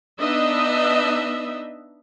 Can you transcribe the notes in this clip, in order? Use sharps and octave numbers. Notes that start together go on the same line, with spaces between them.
B3 D4 D#4 D#5 E5